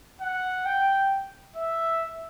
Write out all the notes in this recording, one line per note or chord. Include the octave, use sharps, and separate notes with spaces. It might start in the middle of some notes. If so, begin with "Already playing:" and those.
F#5
G5
E5